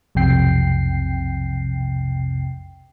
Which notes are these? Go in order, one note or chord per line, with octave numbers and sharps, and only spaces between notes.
B1 F2 C3 G5 C7